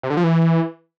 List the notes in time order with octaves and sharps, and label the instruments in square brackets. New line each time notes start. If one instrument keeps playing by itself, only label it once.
[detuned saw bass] C3
D3
F3
E3